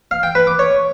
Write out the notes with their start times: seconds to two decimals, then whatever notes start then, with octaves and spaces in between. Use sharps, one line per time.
0.11 F5
0.23 G5
0.35 B4
0.47 D6
0.59 C#5